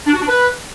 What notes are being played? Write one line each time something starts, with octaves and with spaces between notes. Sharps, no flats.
D4
F#4
D4
B4